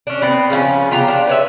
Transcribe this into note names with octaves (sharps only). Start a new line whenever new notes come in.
C#4 D4
B3 C4 F#5
C#3 F3 A3 C#4
B3 F4 G4 A#5
D4
B4 C#5 E5